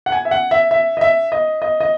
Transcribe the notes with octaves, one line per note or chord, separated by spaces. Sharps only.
F#5
G#5
E5
F#5
E5
E5
D#5
E5
D#5
D#5
D#5